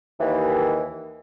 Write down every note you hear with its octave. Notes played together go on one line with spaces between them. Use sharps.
D#2 E3